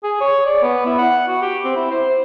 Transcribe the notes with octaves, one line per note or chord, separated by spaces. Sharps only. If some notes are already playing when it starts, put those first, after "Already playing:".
G#4
C#5
D5
B3
E4
F#5
F#4
G4
C4
E4
C5